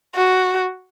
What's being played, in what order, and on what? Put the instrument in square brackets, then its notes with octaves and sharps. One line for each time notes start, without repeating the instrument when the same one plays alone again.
[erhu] F#4